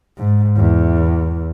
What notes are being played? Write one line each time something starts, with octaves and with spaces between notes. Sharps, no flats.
G#2
E2